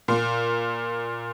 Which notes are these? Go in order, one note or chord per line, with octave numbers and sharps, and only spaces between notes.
A#2